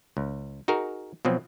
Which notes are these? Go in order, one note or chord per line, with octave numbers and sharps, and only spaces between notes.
C#2
D#4 F#4 G#4 A#4
B2 F3 F#3 C4